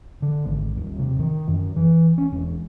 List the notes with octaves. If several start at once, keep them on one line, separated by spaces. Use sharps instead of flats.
D3
G#1
D#1
C3
D#3
F#2
E3
C#4
E1